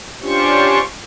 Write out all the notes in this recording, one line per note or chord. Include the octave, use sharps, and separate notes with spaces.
C#4 D4 F4 G4 C5 C#6